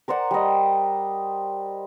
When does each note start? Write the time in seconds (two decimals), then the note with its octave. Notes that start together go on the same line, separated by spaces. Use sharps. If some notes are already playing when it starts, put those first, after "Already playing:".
0.08 A#4 C5 D5 F#5
0.31 G3 D#5